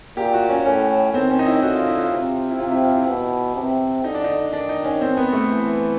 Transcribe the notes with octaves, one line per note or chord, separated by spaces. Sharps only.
A#2 G4
F#4
C#4
A2 C#4
D#3 C4
C#4
D#4
E4
D3 F#4
F4
E4
F4
C3
E4
C3 F4
E4
F4
E4
B2
C3
D3 D#4
D4
D#4
D#3 D4
D#4
C#4
C4
B3
A3
E3